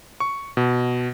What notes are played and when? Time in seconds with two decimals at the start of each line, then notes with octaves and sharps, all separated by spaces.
0.20 C#6
0.57 B2